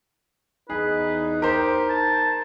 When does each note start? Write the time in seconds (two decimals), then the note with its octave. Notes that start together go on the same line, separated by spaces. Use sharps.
0.70 E2 D#4 G#4 B4
1.42 G4 A#4 C5
1.90 A5